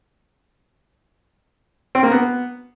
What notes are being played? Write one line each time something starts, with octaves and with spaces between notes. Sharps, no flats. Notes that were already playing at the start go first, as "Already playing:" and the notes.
C4
A#3
B3